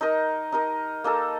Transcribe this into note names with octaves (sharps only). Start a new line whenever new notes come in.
D#4 A#4 D#5
D#4 A#4 D#5
A#3 D#4 A4